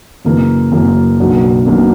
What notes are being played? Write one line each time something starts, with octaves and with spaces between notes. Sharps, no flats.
F#2 C#3 E3 A#3
F#2 C#3 E3 A#3
B1 B2 F#3 A#3 D4
B1 B2 F#3 A#3 D4